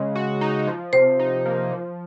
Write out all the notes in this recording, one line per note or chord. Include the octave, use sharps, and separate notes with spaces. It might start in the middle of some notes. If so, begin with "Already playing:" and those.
Already playing: C#3 G#3 D#5
F#4
D#4
F3
C3 C5
D#4
A#3
F3